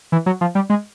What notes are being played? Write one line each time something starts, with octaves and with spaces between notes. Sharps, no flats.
E3
F#3
F3
G3
G#3